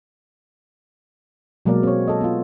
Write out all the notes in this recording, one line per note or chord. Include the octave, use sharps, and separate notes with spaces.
B2 F#3 G#3 A#3 A#4 D5
C4 C#5
A4 D#5
B3 F4